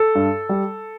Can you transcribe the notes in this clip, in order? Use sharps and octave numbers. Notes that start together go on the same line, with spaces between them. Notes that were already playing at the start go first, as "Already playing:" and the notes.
Already playing: A4
G2
G3